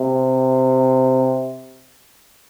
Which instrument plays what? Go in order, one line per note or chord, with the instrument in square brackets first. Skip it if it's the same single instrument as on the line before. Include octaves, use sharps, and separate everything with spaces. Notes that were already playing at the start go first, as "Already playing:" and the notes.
Already playing: [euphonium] C3